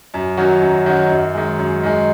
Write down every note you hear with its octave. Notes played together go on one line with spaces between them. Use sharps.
F#2
D#3 F#3 C#4 F#4
F#2
D#3 F#3 C#4 F#4
F#2
D#3 G#3
F#2
D#3 G#3